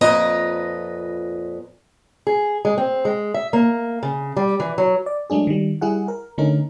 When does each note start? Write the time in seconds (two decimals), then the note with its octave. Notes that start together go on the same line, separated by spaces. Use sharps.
0.01 F2 A#2 B4 D#5 A#5
2.27 G#4
2.65 G#3
2.78 C4
3.05 G#3
3.34 E5
3.53 A#3
4.03 C#3
4.37 G3
4.60 E3
4.78 F#3
5.06 D5
5.30 F#3 G#3 A3 D4 G#4
5.47 D#3 G3
5.81 G3 E4 G#4 F#5
6.08 A#4
6.38 D3 A3 C#4 D#4 A#4